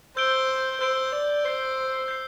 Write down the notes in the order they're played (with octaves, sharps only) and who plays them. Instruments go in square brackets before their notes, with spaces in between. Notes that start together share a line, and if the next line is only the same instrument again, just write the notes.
[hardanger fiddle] C5 [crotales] E6 G6 D7 G7
[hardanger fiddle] C5 [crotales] E6 G6 D7 G7
[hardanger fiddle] D5
[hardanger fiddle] C5 [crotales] G6 C7 G7
[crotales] G6 C7